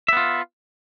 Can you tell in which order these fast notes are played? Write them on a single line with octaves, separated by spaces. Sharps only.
E5 B3 F4